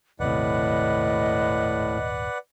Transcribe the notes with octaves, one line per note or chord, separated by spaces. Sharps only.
D#1 G#1 A2 C3 B4 D5 D#5 F#5